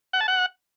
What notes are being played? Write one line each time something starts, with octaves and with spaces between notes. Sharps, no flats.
F#5
A5
F#5